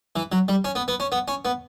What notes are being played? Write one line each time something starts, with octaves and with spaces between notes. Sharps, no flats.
E3
F#3
G3
C#4
B3
B3
C#4
B3
C#4
B3